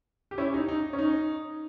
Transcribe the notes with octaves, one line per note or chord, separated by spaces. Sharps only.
G4
C#4 E4
D#4
D#4
C#4
D#4